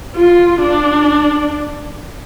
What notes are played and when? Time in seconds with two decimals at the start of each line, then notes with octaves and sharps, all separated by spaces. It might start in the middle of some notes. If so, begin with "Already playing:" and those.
0.15 F4
0.62 D4